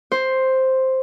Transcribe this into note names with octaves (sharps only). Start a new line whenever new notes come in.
C5